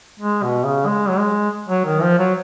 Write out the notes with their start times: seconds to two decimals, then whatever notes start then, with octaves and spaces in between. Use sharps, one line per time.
0.20 G#3
0.43 B2
0.64 C#3
0.87 G#3
1.09 F#3
1.19 G#3
1.69 F#3
1.86 D#3
2.02 F3
2.19 F#3